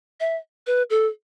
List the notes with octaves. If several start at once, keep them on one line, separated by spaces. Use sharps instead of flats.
E5
B4
A4